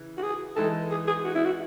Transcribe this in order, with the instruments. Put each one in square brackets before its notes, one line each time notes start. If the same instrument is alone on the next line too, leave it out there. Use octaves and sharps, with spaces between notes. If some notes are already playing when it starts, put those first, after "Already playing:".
Already playing: [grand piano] C#3 E3
[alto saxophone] F#4
G#4
[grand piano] E3 G#3 D#4 [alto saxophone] A4
[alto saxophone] G#4
G#4
F#4
E4
F#4